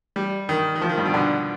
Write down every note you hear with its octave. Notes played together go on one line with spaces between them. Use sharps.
G3
D#3
D#3
F3
D#3
G2
B2
D3